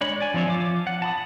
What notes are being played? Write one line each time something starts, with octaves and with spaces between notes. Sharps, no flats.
G#3 D4 C#5 B5
D5 G#5
F3 C4 C5 C#5 E5
F3 F4 D6
F#5
A5 B5 D#6